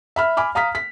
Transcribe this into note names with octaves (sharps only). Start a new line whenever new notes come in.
E5 B5 F6
G#5 B5 D6 F6
F5 A#5 D#6 F6 B6
B6